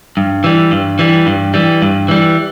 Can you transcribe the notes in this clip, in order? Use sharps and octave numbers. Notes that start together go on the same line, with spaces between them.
G2
E3 G3
G2
E3 G3
G2
E3 G3
G2
E3 G3